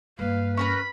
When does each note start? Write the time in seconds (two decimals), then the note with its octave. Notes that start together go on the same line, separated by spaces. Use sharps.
0.19 G2 D3 A#3 B4 F5
0.57 C#4 A#4 B4 B5